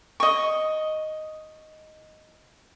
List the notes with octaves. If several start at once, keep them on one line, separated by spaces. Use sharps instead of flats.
D#5 C#6